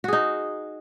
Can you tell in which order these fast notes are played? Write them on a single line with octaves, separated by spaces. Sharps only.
F#4 G#4 D#4